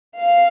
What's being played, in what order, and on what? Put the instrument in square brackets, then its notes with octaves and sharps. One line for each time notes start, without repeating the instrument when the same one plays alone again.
[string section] F5